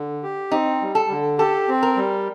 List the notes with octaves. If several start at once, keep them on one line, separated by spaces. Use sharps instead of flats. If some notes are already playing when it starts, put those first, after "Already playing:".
Already playing: D3
G4
C4 D#4
G3
A4
D3
G4 A4
C4
A#4
G3